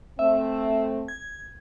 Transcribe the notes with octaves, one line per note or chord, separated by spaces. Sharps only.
A3 C4 E5
G#6